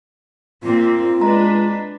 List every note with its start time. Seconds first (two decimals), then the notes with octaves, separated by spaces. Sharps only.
0.63 A#2 A#3 C4 F4
1.21 G#3 D4 B4 A#5